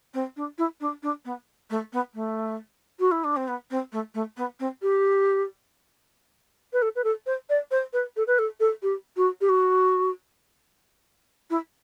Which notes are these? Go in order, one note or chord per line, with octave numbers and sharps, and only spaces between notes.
C4
D4
E4
D4
D4
B3
A3
B3
A3
F#4
E4
D4
C4
B3
C4
A3
A3
B3
C4
G4
B4
A4
B4
A4
C5
D5
C5
B4
A4
B4
A4
A4
G4
F#4
G4
F#4
E4